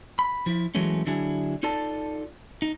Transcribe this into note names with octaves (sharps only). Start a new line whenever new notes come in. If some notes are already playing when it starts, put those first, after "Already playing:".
B5
F3 E4
E3 F#3 G#3 A3 C#4
D3 F#3 D4 E4 G#4
D#4 F4 A4 D5 A5
D#4